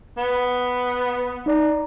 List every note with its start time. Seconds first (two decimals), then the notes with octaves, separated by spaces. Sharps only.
0.17 B3
1.46 D#4 D5 A#5